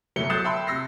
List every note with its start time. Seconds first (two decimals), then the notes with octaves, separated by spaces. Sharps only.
0.16 G1 C2 F#3 A3 C#7 G7
0.30 D#6 F#6 G6 A6 C7 E7
0.44 E5 G5 A5 B5 C6 E6
0.67 C3 E6 A#6 C7